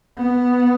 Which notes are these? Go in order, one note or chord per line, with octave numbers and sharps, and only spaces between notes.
B3